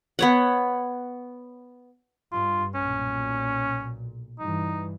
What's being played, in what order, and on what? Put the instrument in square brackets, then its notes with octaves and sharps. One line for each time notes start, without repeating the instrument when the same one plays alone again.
[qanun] B3 C#5 F#5
[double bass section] G2 [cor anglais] F4
[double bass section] B1 A#2 [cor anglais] C#4
[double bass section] G2 E3 [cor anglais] D#4